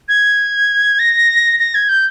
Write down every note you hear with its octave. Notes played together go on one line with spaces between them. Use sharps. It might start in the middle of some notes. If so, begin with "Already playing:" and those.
G#6
A#6
A#6
G#6
G6